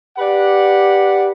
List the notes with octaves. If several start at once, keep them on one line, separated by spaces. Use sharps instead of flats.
G4 B4 D5 F#5